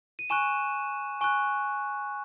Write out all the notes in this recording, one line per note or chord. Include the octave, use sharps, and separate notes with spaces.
D#7
G#5 C#6 F#6 E7
G#5 C#6 F#6